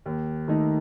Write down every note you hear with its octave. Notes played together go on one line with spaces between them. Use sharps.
D#2
D#3 A3 D#4